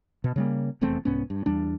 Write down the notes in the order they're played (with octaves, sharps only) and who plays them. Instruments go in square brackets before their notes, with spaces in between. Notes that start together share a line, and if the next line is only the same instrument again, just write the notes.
[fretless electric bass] B2
C#3 G3 A#3
F1 E2 A3 C4
C2 G#2 B3 C#4
G2
E2 G3 D4